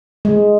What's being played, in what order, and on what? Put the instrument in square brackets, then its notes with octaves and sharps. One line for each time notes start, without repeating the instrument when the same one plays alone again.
[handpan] G#3